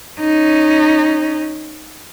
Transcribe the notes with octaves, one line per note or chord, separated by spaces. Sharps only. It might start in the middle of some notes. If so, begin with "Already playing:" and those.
C#4 D#4